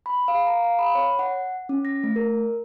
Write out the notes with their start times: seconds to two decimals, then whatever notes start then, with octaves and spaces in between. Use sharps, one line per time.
0.06 B5
0.28 F5
0.47 A#5
0.64 F5
0.79 B5
0.95 C#5
1.19 F#5
1.69 C#4
1.85 A#6
2.04 A3
2.16 A#4